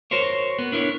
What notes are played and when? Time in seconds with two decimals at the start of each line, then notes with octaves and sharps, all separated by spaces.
0.11 F#4 A#4 C5 C#5
0.59 B3
0.72 D4 E4 A#4 C5 C#5